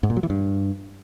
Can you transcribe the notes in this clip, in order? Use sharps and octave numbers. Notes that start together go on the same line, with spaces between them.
G#2
A#2
F#3
E3
G2